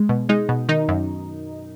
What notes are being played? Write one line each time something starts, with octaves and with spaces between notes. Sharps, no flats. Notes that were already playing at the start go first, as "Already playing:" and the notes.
Already playing: G#3
B2
G#3 D#4
B2
D#3 D#4
F#2